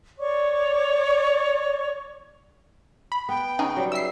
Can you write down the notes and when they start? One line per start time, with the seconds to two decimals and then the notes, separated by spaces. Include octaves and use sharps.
0.19 C#5 D5 C#6 D6
3.12 B5
3.29 B3 G5
3.59 C#3 D#4 G#4
3.76 F#3 G3 B3
3.92 E5 E6 C7